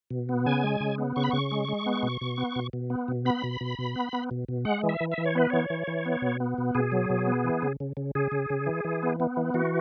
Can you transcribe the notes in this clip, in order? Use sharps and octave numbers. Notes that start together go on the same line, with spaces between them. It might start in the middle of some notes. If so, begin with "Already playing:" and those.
B2
B3
C#3 G#5
G#3
C#3
B3
C#3 C#6
B5
C#3 C#6
G#3
G#3
B3
B2
B2
B3
B2
B2
B3
B2
B3 B5
B2
B2
B2
B3
B3
B2
B2
G#3 F#5
E3
E5
E3
E5
E3
C#5
B3 B4
E3 C#5
E3
E3
B3
B2
B3
B2
B2 G#4
F#3
B2
B3
E3
C#3
C#3
C#3
C#3 G#4
C#3
C#3
E3
E3
B3
B3
E3
E3 F#4